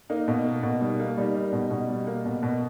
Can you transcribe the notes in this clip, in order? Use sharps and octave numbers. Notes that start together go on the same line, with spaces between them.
A#3 D#4
B2
A#3
B2
G3 D#4
A#3
G3 D#4
G3
B2
B2
G3
A#3
B2
B2